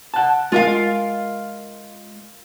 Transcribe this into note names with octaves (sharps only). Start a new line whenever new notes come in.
F#5 A5
G#3 F4 A#4 F5